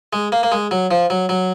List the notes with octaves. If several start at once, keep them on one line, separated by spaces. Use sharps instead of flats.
G#3
A#3
A#3
G#3
F#3
F3
F#3
F#3